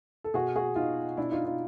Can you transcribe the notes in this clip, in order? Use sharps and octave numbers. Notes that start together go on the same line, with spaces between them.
A4
B2 F#4 G#4
F#4 G#4
B2 D#4 F4
B2 D4 E4
D#4 F4
D#4 F4